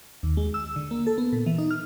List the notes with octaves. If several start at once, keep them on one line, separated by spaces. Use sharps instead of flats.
D#2
G#3
E6
D3
A#3
A4
B3
A#2
E3
D#4
F6